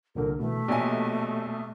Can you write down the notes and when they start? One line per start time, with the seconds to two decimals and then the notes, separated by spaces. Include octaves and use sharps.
0.15 C2 A#2 D3 A#4
0.39 B2 E3 A3
0.68 A#1 B2 G4 C#5 G#5